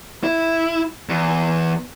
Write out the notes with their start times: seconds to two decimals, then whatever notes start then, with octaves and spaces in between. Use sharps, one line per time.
0.24 E4
1.09 E2